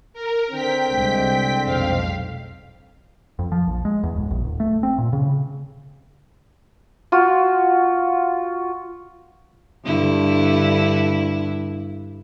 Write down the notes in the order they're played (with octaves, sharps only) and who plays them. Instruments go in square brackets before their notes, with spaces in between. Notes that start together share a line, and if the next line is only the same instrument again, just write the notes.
[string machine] A#4
[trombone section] D3 C4 [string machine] G5 B6
[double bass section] C2 G#3
[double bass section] B1 F2 G#2 [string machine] F5
[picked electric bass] F2
F3
A#1
G#3
E2
D1
A#1
D1
A3
C4
A#2
C#3
[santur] F4 F#4
[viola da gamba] G2 D3 E4